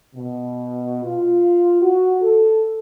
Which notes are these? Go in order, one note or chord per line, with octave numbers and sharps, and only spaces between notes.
B2
F4
F#4
A4